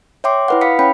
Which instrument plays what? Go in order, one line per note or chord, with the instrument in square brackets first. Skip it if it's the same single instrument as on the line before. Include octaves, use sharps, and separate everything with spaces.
[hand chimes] C#5 E5 G5 C6 D6
E4 B4 F#5
F5 B5 D#6 B6 C#7
C#4 C#5 G5 B5